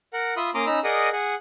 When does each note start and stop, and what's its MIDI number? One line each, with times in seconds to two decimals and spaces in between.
0.13 0.34 70
0.13 0.34 78
0.37 0.50 65
0.37 0.50 76
0.37 0.50 83
0.37 0.50 84
0.37 0.50 87
0.54 0.65 58
0.54 0.65 61
0.54 0.65 82
0.54 0.65 84
0.54 0.65 86
0.54 0.65 87
0.66 0.79 61
0.66 0.79 63
0.66 0.79 82
0.66 0.79 83
0.66 0.79 88
0.84 1.09 68
0.84 1.09 70
0.84 1.09 74
0.84 1.09 75
0.84 1.09 78
0.84 1.09 87
1.12 1.35 68
1.12 1.35 78